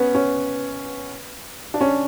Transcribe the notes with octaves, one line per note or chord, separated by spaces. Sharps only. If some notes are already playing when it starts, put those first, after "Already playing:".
Already playing: B3 C#4
C#4
D4
C#4